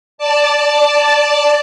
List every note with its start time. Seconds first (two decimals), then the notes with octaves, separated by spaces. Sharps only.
0.18 D5 A5